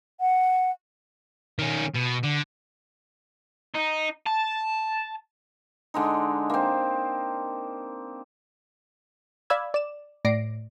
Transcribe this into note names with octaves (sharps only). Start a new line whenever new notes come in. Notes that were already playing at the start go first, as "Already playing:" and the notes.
F#5
D#3 C#4
B2
D3
D#4
A5
D3 G#3 D#4
A#3 C4
D5 F5 B5 E6 G#6
D5 E7
A2 D5 A#6 C7 D7